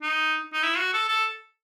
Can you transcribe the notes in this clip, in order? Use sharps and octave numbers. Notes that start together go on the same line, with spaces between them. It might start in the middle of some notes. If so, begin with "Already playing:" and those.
D#4
D#4
E4
F#4
A4
A4